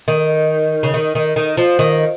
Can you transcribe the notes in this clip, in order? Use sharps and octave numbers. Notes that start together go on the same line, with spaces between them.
D#3
C#3
D#3
D#3
D#3
F3
D#3